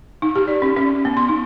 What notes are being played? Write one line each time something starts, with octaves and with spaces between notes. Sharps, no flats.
D#4
G4
D5
C#4
C#4
B3
C6
D#4